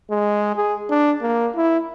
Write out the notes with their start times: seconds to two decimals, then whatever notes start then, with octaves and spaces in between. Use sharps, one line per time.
0.11 G#3
0.56 G#4
0.90 D4
1.22 A#3
1.56 E4